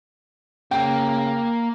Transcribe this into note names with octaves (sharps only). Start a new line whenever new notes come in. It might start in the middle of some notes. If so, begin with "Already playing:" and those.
C#3 A#3 G5